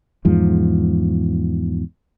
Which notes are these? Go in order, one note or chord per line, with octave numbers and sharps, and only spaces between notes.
E2 G#2 F3